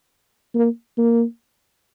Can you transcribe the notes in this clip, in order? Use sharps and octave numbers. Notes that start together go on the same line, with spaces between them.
A#3
A#3